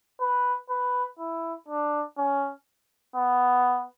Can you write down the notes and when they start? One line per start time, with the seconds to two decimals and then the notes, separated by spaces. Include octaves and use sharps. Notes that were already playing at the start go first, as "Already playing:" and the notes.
0.21 B4
0.70 B4
1.19 E4
1.68 D4
2.18 C#4
3.16 B3